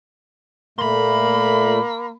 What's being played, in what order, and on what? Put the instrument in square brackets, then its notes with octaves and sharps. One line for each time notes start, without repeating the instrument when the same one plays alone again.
[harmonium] A#2 A3 [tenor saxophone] A#3 [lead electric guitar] B5 C6